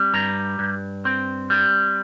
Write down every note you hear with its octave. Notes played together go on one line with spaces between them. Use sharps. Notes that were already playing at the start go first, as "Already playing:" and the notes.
Already playing: G3 C4
G2 A#5
G2
C4
G3